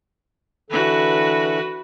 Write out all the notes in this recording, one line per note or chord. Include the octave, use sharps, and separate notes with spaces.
D3 E3 F#4 A4 B4